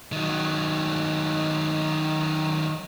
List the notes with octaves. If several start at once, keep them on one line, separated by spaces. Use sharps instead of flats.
D#3 F#3